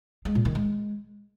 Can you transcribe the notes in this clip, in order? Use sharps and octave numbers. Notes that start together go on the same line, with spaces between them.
G#3
A#2
D#3
G#3